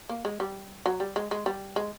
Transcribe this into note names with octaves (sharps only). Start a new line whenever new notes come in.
A#3
G#3
G3
F#3
G3
G#3
G#3
G3
G#3